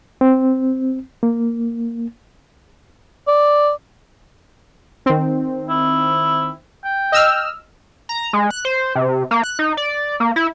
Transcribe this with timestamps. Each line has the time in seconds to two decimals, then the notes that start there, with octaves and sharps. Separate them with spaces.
0.21 C4
1.23 A#3
3.28 D5
5.06 D#3 C4
5.69 E4
6.85 G5
7.12 D#5 E6 F6
8.09 A#5
8.33 G#3
8.51 F#6
8.65 C5
8.95 C3
9.31 A#3
9.44 F#6
9.59 D#4
9.77 D5
10.20 A#3
10.36 E4